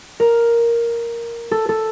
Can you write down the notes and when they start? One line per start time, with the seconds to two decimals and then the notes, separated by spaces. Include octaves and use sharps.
0.20 A#4
1.51 A4
1.69 A4